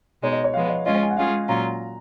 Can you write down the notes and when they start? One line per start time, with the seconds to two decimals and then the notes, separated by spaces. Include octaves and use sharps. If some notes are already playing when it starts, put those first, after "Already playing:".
0.22 B2 G#3 D#4 C#5
0.33 D#5
0.44 C#5
0.54 F3 G#3 B3 F5
0.69 D#5
0.85 G#3 C#4 F4 D#5
1.03 G#5
1.10 F#5
1.17 G#3 C#4 F4 G#4 F5
1.48 A#2 F#3 C#4 F4 A#5